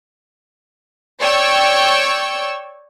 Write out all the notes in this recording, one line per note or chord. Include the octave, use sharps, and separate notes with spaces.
C#5 D5 G5 C#6 E6